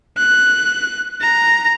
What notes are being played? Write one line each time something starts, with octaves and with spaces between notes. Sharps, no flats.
F#6
A#5